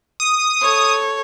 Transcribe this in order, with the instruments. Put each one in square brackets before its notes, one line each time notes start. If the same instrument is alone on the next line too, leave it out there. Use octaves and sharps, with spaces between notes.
[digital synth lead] D#6
[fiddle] A4 C#5